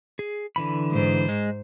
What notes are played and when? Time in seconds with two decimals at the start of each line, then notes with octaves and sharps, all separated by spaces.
0.19 G#4
0.56 D3 E3 B5
0.92 G#2 C5
1.29 G#3